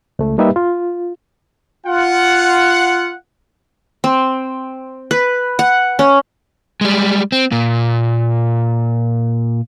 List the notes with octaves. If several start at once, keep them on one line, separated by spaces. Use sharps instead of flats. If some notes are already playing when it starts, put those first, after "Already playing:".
C#2 A3
G3 A#3 D#4 G4 B4 E5
F4
F4 F#5
C4
B4
F#5
C#4
G3 G#3
C4
A#2